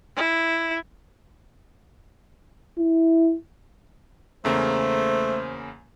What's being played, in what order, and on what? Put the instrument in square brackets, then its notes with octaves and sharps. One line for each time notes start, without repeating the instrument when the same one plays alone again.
[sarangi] E4
[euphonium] E4
[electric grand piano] E2 C#3 A#3 [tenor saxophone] A3 [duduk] C5